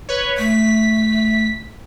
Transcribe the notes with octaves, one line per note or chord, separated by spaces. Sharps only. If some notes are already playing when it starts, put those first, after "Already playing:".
B4 C#5
A3 B6